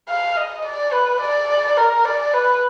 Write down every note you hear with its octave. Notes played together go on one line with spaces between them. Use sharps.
F5
D#5
D5
B4
D5
A#4
D5
B4